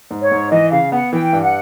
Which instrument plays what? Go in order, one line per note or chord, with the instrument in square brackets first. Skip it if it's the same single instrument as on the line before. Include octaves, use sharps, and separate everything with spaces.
[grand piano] G#2
[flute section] C#5
[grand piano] G#2
[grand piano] E3 [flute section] D#5
[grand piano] C#3 [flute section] F5
[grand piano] B3 [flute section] F#5
[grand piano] E3 [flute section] G5
[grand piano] G2
[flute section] F#5